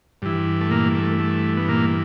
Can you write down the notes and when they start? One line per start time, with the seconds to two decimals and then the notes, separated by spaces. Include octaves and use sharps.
0.22 G2 E3
0.61 A3
0.71 A#2 A#3
0.95 A3
1.19 A3
1.57 B3
1.68 A#2 A#3